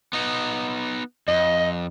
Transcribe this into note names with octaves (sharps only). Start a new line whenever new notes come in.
B3 D#4
F2 D#5